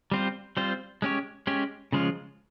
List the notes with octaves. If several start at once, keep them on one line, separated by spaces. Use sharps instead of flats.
G3 C4 F4 C5
G3 C4 F4 C5
G#3 C#4 G4 C#5
G#3 C#4 G4 C#5
C#3 F3 G#3 C#4 F4